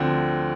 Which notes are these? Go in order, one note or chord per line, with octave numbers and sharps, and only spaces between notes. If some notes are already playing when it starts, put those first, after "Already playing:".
Already playing: D2 D3 F3 C4